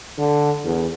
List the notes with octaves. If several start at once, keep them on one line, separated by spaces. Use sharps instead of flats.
D3
E2